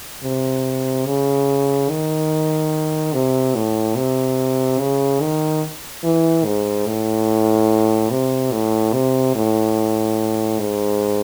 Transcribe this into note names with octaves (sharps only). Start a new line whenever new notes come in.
C3
C#3
D#3
C3
A2
C3
C#3
D#3
E3
G#2
A2
C3
A2
C3
A2
G#2